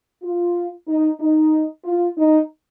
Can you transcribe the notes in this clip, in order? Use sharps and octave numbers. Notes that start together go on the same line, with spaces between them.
F4
D#4
D#4
F4
D#4